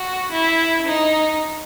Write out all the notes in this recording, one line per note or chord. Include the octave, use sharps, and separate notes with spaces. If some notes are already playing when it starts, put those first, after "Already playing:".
Already playing: F#4
E4
D#4